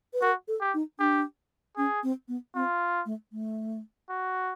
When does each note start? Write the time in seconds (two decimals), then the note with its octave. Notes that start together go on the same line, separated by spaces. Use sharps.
0.14 B4
0.22 F#4 A#4
0.48 A4
0.61 G4
0.74 D#4
0.99 D4 G4
1.77 C#4 G#4
2.03 C4
2.28 B3
2.55 C4 F4
3.06 A3
3.32 A3
4.09 F#4